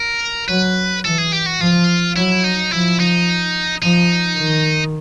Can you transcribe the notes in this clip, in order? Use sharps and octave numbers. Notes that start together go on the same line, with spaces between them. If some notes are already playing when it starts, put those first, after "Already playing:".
Already playing: A#4
F#3 B4
E3 A4
G#4
G4
F#4
F3 F4
F#3 E4
D#4
F3 E4
D#4
F3 D#4
D#3